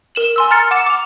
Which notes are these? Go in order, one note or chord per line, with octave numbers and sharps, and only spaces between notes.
A#4 E7 F#7
G#5 C6 E6
A#5 F6 A6 C#7
F#5 D6 C#7 E7
D6 F7